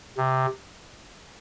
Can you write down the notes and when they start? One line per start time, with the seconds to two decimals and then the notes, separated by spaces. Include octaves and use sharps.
0.17 C3